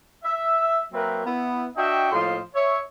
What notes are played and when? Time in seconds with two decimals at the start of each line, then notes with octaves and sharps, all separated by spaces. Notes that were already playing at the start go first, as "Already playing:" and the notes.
0.24 E5
0.93 F#3 A#3 C4 A#4 B4 E5
1.26 B3 E4
1.77 D4 F#4 D#5 E5 G5
2.12 A2 F3 A#3 D#5 F5 C6
2.54 C#5 E5